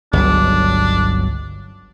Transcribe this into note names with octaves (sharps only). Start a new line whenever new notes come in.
G1 C#2 F#3 D4